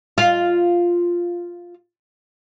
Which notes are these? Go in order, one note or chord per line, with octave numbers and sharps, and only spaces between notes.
F4 F5